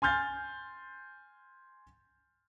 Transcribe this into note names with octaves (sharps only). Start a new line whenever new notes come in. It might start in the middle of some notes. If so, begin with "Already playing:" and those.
G#5 C6 F6 G6 A6